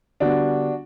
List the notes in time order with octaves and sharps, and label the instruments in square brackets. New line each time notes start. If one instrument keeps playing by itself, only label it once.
[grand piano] D3 G3 B3 D4 F#4